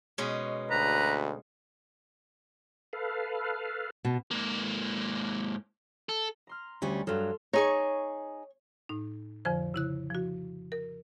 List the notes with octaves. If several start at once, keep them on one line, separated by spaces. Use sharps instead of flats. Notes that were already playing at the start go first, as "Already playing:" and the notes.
B2 G#3 C#4
D2 B4 A#5
A4 B4 F5
B2 A5
G#2 A#3
A4
A#5 C6 F6
D2 G3 C#4
G2 F#3 A4 C6 F6
D#4 G#4 C#5 C#6
A2 D#4
F2 D3 F3 C5
C#3 E4 F#6
F3 F#4
A#4